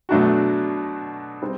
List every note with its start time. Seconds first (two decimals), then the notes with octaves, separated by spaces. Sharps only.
0.09 B2 F#3 A3 D4 F#4
1.42 G3 C4